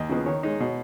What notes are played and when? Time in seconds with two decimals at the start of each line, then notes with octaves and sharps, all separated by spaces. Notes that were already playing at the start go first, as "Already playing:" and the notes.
Already playing: D#2 D#5
0.09 C#3 F3 B3
0.26 D#3 C#5
0.43 G#3 D#4
0.60 B2